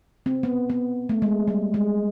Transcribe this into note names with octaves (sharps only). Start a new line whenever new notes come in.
C4
B3
B3
A3
G#3
G3
G#3